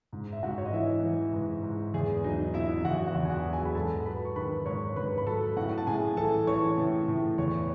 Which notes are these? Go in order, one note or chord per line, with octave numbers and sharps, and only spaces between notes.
G#2
E5
G#2 F#4 F#5
C#5
D#5
E3 E4 E5
E3
G#2
G#2
E2 G#4
F#3 D#4 D#5
B2 E4 E5
E2 F#4 F#5
F#4 F#5
E2
G#5
F#4 F#5
F#3
G#4 G#5
B5
G#2 A4 A5
F#3 B4 B5
C#6
D#3 B4 B5
G#2 C#5 C#6
G#2 B4 B5
B5
F#3 A4 A5
A2 F#4 F#5
A5
A2 G#4 G#5
E3 A4 A5
E3 C#5 C#6
A2
A2
E2 C#5 C#6